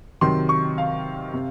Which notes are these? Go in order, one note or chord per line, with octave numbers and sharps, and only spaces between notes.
C3 D#3 F#3 C6
C#6
F5
C3